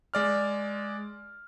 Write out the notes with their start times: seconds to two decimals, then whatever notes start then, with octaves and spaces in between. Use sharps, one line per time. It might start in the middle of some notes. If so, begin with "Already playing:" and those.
0.14 G#3 D5 F6